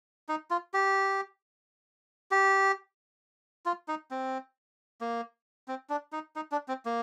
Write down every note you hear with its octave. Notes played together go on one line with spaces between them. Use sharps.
D#4
F4
G4
G4
F4
D#4
C4
A#3
C4
D4
D#4
D#4
D4
C4
A#3